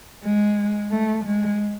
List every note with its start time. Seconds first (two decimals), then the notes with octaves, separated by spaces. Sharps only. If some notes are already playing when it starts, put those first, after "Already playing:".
0.24 G#3
0.91 A3
1.25 G#3